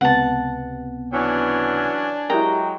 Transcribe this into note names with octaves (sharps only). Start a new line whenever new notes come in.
C#2 C3 B3 F#5 A5
E3 F#3 C#4 D4 G#5
F#3 G#3 E4 G4 A#4 G5 A#5